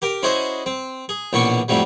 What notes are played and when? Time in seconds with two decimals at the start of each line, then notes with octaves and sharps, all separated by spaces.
0.02 G4 A#4 G5
0.23 C#4 E4 F#4 G#4 C5 D#5
0.66 C4
1.09 G#4
1.33 A#1 B2 E3 C#4 D4 C#6
1.68 F2 A2 C3 F#3 G3